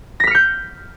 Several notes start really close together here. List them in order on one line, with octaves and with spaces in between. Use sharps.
A#6 B6 F6 C#7 G6